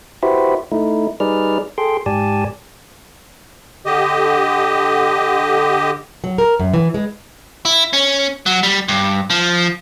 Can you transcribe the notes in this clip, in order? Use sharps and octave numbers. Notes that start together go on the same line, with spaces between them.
E4 F#4 G4 B4 C5 E5
A3 D#4 E4
G3 D#4 G#4 B4 D5 F6
G#4 A4 G5 C6
G#2 G4 D5 G#5 A5
D3 G4 D#5
F#3
A#4
F#2
E3
G#3
E4
C#4
F#3
G3
G2
F3